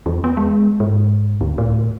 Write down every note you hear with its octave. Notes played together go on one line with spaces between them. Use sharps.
E2
B3
G#3
G#2
D2
A2